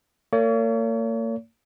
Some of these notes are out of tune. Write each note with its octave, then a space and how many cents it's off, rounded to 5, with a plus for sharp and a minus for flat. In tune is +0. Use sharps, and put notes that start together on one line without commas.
A#3 -40 C#5 +40